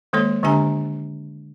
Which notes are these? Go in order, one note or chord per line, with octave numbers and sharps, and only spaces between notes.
D#3 G#3 A#3 A4 C#5 C6
D3 G#3 D4 G4 G#5 A#5